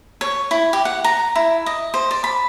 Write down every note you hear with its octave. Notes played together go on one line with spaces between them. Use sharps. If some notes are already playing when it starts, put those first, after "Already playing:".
C#5
E4
G4
F#5
A#5
E4
D#5
C5
D5
B5